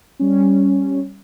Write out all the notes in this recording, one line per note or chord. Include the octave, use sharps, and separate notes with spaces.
G3 C#4